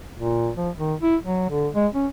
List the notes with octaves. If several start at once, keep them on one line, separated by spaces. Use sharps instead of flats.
A#2
F3
D#3
E4
F#3
D3
G#3
C#4